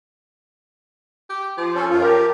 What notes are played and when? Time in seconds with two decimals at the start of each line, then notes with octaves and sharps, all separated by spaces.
1.29 G4
1.58 F3
1.75 C#4 A4
1.90 F#2 F4
2.02 G4 A#4